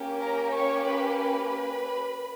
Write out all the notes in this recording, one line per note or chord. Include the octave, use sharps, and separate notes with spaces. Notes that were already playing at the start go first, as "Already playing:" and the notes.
Already playing: A#3 C#4 G4
A#4 A#5
C#5 C#6
B4 B5
B4 B5